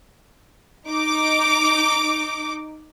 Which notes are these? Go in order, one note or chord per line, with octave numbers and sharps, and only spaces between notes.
D#4 D6